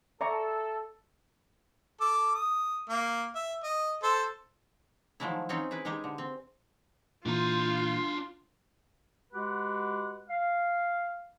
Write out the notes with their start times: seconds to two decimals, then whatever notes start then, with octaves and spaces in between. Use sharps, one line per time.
0.21 A4 D5 E5 A#5 C#6
2.00 A4 D6
2.35 D#6
2.89 A#3 F6
3.35 E5
3.64 D#5
4.03 A4 C5
5.20 D#3 F3 F#3 G#3 A3 E4
5.49 C4 C#4 D#4 G#4
5.71 E4 G#4 B4
5.85 G#3 D#4 G4 G#4
6.04 D3
6.18 C4
7.26 A#2 E3 D4 F4 A#5 C6
9.33 G#3 F#4 G4 B4 F#5
10.29 F5